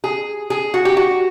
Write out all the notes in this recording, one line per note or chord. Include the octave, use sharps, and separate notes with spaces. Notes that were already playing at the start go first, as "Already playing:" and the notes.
G#4
G#4
F#4
G4
F#4